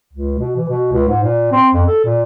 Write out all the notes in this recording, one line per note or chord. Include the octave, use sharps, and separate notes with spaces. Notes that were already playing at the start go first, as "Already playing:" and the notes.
C#2
B2
E3
B2
C#2
G#2
A#2
C4
F2
A4
A#2